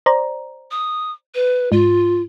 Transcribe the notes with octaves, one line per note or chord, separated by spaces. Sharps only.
C5 D5 A#5
D#6
B4
G#2 F4